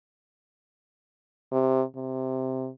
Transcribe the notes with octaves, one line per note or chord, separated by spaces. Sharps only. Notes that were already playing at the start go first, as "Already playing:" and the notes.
C3
C3